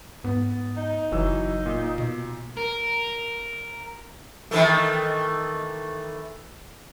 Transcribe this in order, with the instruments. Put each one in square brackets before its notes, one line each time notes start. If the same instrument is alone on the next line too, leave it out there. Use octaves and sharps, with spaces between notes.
[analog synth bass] G#2 [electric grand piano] B3
[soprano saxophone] D#4
[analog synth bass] F#1 [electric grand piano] E3 F#3 E6
[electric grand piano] A#2
[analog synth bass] B2
[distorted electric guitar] A#4
[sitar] D#3 E3 A3